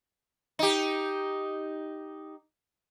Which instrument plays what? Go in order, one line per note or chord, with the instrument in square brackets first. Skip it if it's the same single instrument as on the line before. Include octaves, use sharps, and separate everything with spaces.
[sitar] D#4 G4